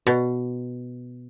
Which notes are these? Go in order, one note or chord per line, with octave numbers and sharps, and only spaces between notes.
B2